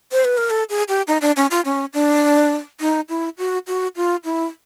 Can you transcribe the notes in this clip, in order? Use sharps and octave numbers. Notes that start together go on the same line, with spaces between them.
C5
B4
A#4
A4
G#4
G4
D#4
D4
C#4
F4
C#4
D4
D#4
E4
F#4
F#4
F4
E4